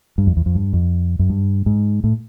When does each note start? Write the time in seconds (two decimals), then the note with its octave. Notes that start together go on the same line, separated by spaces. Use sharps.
0.18 G2
0.27 F2
0.37 E2
0.46 F2
0.55 G2
0.73 F2
1.19 F#2
1.30 G2
1.66 G#2
2.04 A2